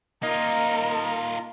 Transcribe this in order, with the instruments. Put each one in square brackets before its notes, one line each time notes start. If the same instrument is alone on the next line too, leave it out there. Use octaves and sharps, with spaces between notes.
[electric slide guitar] A#3 [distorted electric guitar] D#4 F4 [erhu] A#4 [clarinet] D#5